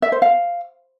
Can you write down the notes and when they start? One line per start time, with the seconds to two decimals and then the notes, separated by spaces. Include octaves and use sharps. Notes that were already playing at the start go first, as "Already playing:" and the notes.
0.02 E5
0.12 C5
0.22 F5